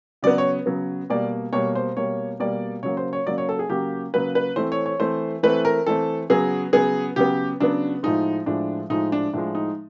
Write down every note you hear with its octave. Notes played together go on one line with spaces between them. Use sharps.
C#3 F#3 B3 D5
C#5
C#3 F#3 B3
B2 G3 A#3 D5
B2 G3 A#3 C#5
C5
B2 G3 A#3 C#5
B2 G3 A#3 D5
C#3 F#3 A#3 C#5
C5
C#5
C#3 F#3 A#3 D5
C#5
A4
G#4
C#3 F#3 A#3 G4
C#3 F#3 A#3 B4
B4
E3 A3 C4 C5
C#5
C#5
E3 A3 C4 C5
E3 A3 C4 B4
A#4
E3 A3 C4 A4
C#3 F#3 B3 G#4
C#3 F#3 B3 G#4
C#3 F#3 B3 G4
C#3 F#3 B3 D4
A2 F3 G#3 D#4
A2 F3 G#3 D4
A2 F3 G#3 D#4
D4
A2 F3 G#3 D4
D#4